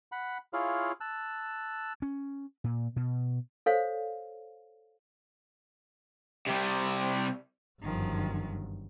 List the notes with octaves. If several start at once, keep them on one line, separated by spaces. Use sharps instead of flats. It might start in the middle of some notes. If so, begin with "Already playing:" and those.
F#5 B5
E4 F4 G#4 C#5 F5
A5 E6 F#6
C#4
A#2
B2
A4 C5 C#5 F5
C3 G3
G1 F#2 D#3 F3